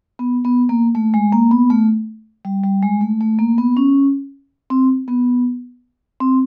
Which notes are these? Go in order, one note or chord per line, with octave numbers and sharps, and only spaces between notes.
B3
B3
A#3
A3
G#3
A#3
B3
A3
G3
G3
G#3
A3
A3
A#3
B3
C#4
C4
B3
C4